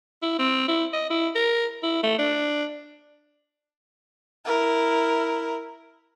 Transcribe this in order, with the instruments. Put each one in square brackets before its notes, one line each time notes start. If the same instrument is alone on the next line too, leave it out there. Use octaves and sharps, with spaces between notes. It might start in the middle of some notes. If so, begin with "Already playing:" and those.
[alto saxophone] E4
C4
E4
D#5
E4
A#4
E4
A3
D4
[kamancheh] E4 A#4